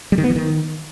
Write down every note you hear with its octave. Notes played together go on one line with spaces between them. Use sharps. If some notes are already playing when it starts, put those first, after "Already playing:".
G3
D#3
B3
E3
D#3